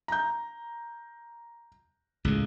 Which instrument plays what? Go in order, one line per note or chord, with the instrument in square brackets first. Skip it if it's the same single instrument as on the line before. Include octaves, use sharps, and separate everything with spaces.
[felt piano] A#5 G6
[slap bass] C#2 A2 C#3